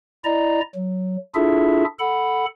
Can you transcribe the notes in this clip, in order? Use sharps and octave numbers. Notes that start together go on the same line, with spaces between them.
E4 D5 D#5 A#5
F#3
D4 E4 F4 G#4 A4 E5
A4 F#5 B5